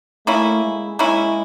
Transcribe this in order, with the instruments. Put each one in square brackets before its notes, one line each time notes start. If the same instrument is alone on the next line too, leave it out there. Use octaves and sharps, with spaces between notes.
[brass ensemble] A3 [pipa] A#3 C#4 E4
[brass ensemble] G#3
[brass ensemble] G#3 [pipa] A#3 C#4 E4